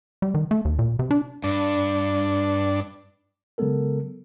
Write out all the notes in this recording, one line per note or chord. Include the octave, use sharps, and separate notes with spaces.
G3
D#3
A3
D#2
A#2
C3
D4
G2 D4
C#3 F#3 G#3 B3 A4 A#4